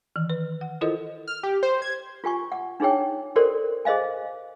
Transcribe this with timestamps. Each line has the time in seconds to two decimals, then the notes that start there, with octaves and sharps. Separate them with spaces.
0.16 D#3 E3
0.30 B4
0.61 F#5
0.81 E4 F4 A4 A#4 C5 D#5
1.28 F6
1.43 G4
1.63 C5
1.82 G#6
2.24 F4 G4 G#5 C#6
2.52 F#5
2.80 D4 D#4 G#4 C#5 G5
3.36 F#4 G4 A4 A#4 C5 D5
3.85 G#4 C5 D#5 F5 G#5